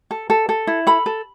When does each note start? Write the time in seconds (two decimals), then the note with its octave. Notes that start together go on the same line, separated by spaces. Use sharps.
0.11 A4
0.30 A4
0.49 A4
0.67 E4
0.87 A4 B5
1.06 A4